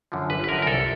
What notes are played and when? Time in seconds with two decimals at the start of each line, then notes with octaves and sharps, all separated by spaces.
0.12 F#2 D3 F3
0.30 G1 B4
0.44 B4
0.49 F#2 D3 F3 A#4
0.62 A#4
0.66 C2 A4